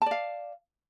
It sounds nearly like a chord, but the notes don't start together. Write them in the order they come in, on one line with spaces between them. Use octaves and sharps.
A5 D5 F5